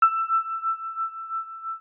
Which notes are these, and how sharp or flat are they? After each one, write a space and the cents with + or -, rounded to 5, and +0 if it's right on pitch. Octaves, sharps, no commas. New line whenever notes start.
E6 +15